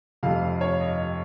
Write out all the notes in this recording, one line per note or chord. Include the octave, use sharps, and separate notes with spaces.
F1 F2 C3 F5
C#5
D#5